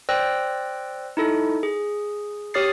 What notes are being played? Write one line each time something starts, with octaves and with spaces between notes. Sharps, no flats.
C5 D5 G5 E6 F#6 A#6
D#4 E4 A4
G#4
G4 C#5 D#6 F6 A6 C7